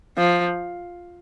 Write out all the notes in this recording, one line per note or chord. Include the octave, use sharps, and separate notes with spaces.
F3